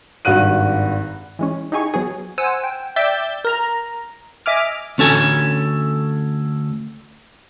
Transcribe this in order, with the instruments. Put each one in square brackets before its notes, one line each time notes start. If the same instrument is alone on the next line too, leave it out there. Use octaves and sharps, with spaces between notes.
[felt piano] G#1 G2 F#4 F#6 D#7
[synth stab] E3 G#3 C#4
D#4 E4 G4 G#4 G#5 C#6
F#3 B3 G#4
C5 F#5 G#5 E6
G5
D5 E5 G5 E6 G6 A6
A#4 A#5
D#5 E5 G#5 D6 F6
[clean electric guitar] D2 C#4 A4 G#5